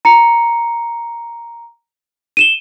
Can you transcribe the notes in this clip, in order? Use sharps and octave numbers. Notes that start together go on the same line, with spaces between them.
A#5 C#7
D#7 E7 G7